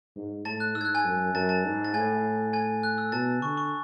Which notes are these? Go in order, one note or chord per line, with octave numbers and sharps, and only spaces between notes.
G#2
A2 A5 A6
F#6
G#2 E6
G#6
F#6
G#5 G#6
F#2
F#2 A5 A6
A5 A6
G#2
A6
A2 G#5 G#6
G#5 G#6
F#6
E6
B2 A5 A6
D3 C#6
C#6